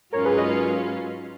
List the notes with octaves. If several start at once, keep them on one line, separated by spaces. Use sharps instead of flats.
G#2 F#3 C#4 F4 A#4 C#5
G#4 B4
B4 D#5